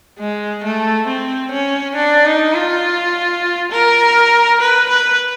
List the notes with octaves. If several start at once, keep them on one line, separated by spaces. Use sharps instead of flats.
G#3
A3
C4
C#4
D4
D#4
F4
A#4
B4
B4